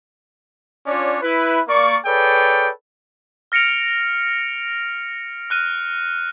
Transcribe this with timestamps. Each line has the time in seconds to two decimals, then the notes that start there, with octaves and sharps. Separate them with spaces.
0.87 C#4 D4 F4 C#5 D5
1.22 E4 B4
1.68 A#3 D5 C#6
2.06 G#4 A4 B4 C#5 D5 G5
3.52 F6 A#6 C#7 D7 F7
5.50 F6 F#6 D#7